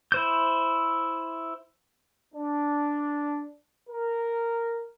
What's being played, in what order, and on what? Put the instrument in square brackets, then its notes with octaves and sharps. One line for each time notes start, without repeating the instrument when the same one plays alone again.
[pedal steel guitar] E4 C5 G6
[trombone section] D4
A#4